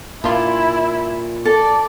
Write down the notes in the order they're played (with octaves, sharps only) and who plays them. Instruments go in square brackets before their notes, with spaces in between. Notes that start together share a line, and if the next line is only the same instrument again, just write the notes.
[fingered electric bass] A#2 [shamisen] D4 F4 [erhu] E4
[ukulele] A4 [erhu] D5